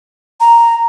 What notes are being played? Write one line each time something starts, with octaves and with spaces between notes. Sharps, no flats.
A#5